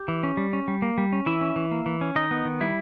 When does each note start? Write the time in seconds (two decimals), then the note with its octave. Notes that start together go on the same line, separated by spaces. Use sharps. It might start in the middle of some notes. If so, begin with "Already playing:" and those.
Already playing: G4
0.08 E3
0.23 C#4
0.37 G3
0.53 C#4
0.68 G3
0.82 A#3
0.98 G3
1.13 C#4
1.26 E3 E4 E5
1.41 C#4
1.56 E3
1.71 A#3
1.86 E3
2.01 C#4
2.15 D#3 D#4 D#5
2.31 B3
2.45 D#3
2.60 G3 E4